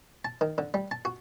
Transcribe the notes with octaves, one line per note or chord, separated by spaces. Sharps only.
A5
D#3
D3
G3
A5
F#4